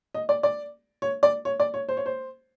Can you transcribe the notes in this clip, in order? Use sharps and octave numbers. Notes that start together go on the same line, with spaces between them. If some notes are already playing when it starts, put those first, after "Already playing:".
D#5
D5
D5
C#5
D5
C#5
D5
C#5
C5
C#5
C5